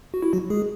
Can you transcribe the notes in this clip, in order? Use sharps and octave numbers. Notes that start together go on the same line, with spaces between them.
F#4
E4
F#3 F#4
G#3 G#4